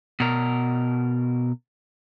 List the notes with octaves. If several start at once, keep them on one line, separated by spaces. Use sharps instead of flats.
B2 A#4